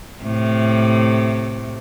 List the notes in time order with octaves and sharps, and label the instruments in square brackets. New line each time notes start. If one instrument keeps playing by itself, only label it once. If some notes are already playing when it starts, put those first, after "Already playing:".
[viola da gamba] A2 C3 A3